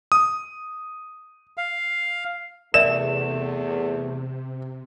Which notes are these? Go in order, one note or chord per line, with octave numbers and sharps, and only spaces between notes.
D#6
F5
E2 C3 A3 A#4 D5 E5 E7